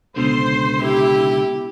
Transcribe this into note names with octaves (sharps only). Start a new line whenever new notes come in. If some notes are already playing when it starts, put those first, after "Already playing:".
C#2 B2 D3 C5 C6
E4 G4